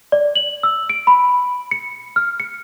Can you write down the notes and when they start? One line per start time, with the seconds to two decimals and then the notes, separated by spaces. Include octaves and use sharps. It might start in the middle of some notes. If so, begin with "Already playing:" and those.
0.12 D5
0.35 F#7
0.63 E6
0.90 D7
1.07 B5
1.71 C#7
2.16 F6
2.40 C#7